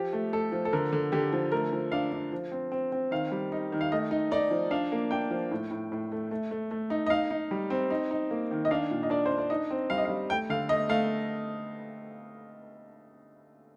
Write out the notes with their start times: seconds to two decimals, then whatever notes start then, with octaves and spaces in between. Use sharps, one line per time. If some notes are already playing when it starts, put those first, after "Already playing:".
Already playing: F3 G4
0.13 A3
0.33 A3 A4
0.52 F3
0.65 A4
0.73 D3 A#4
0.93 D3
1.12 D3 G4
1.33 F3
1.52 A3 A#4
1.72 F3
1.92 D4 F5
2.12 D4
2.32 F3
2.52 C4
2.72 C4
2.92 C4
3.11 D#3 F5
3.32 G3
3.52 D#4
3.72 D#3
3.81 F5
3.92 A3 D#5
4.11 D#4
4.31 D#4 D5
4.51 F3
4.71 D4 F5
4.92 A#3
5.11 D4 G5
5.31 F3
5.51 A2
5.71 A2
5.92 A2
6.12 A3
6.31 A3
6.51 A3
6.71 A3
6.90 D#4
7.06 D#5
7.10 D#4 F5
7.31 D#4
7.51 G3
7.70 C4
7.90 D#4
8.11 D#4
8.31 A#3
8.51 D#3
8.65 D#5
8.71 D4 F5
8.91 A#2
9.03 D#5
9.10 D4 D5
9.26 C5
9.31 D4
9.38 D5
9.50 D#4 D#5
9.71 C4
9.90 G3 F5
9.98 D#5
10.05 F5
10.09 G3
10.30 A3 G5
10.49 D3 F5
10.69 A3 D#5
10.89 A3 F5